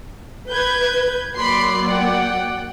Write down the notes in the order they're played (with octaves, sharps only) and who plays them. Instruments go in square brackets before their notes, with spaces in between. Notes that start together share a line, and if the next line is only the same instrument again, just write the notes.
[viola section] B4 [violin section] G6 G#6
[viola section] F#3 A#3 D5 [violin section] B5 C6 C7
[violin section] F#5 G5